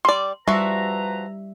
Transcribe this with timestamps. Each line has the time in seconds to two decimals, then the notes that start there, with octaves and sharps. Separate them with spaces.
0.05 G3 D5 C6
0.48 F3 G3 F#4 B4 E5 A#5